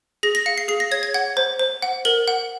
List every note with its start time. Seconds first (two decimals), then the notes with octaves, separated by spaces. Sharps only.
0.23 G#4 A#6
0.35 A#6
0.46 F5 C#7
0.58 C7
0.68 G#4 C7
0.80 A#6
0.91 C#5 G#6
1.03 G#6
1.14 F#5 G#6
1.37 C5
1.59 C5
1.82 F#5
2.05 A#4 F#7
2.28 F#5